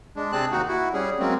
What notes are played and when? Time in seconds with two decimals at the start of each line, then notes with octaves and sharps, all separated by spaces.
0.16 G#3 D4
0.32 C3 C4 G#4 A5 F#6
0.52 D#2 D#4 F#4
0.68 E4 F#4
0.94 G3 C#4 G#4
1.19 F#3 G#3 A#3 C4 C#4